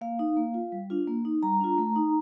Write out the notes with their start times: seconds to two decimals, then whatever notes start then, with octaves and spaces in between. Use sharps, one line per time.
0.01 A#3 F5
0.19 D#4
0.37 A#3
0.54 F4
0.72 G3
0.90 D4 F4
1.07 A#3
1.25 D#4
1.43 G3 A#5
1.61 D4 F4
1.78 A3
1.96 D#4